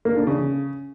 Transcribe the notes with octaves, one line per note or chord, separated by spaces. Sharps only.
A#3
D4
C#3